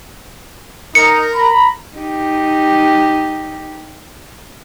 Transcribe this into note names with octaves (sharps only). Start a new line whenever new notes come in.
D#4 A#4 C#7
A#5 B5
D#4 G4